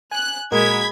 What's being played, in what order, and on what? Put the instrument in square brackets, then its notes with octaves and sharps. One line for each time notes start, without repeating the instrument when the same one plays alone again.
[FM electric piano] G#5 [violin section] F#6
[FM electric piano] A#2 F#4 A#4 [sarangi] G#3 [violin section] B5 G#6 B6